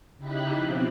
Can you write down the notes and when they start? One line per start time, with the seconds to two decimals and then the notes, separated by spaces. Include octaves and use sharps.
0.18 C#3 D#4 E4 G4 B5 F#6
0.53 B2 F3 C4